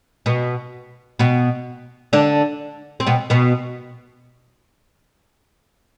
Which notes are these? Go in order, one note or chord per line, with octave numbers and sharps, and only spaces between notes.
B2 B3
B2 B3
D3 D4
C4
B2 B3
B2 B3